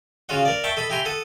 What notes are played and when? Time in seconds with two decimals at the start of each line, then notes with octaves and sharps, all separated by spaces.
0.29 C#3 F4 F#4 D#5 F#5
0.45 A#4 D5
0.64 E5 G5 A5 C#6
0.77 A4 D#5 B5
0.90 E4 G4 G#5 A#5 C6
1.05 A4 F#5 D#6